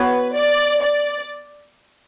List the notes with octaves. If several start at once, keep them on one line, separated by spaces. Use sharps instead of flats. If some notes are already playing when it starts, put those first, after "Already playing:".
Already playing: B3 F#4 B4 C#5
D5
D5